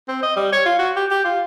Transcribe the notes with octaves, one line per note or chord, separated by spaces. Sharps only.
C4
D#5
G3
C#5
F4
F#4
G4
G4
F4